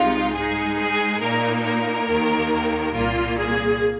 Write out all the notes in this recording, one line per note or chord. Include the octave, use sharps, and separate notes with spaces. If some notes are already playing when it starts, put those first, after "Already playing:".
Already playing: C2 C3 G#3 D#4 F4
G#2 G#3 D#4 G#4
G#4
A#2 A#3 D#4 A#4
A#4
D#2 D#3 A#3
C2 A#2 A#3 F4
G#4